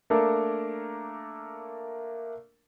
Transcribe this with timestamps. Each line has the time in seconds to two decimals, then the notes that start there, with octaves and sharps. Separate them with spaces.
0.10 A3 A#3 D4 A4 A#4